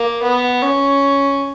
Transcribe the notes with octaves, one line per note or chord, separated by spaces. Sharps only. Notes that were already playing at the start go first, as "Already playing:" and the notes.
Already playing: A#3
B3
C#4